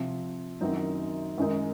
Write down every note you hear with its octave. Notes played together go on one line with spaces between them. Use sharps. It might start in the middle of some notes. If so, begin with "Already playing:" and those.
Already playing: C3 F3 C4
F#2 D#3 F#3 C4 D#4
F#2 D#3 G#3 D#4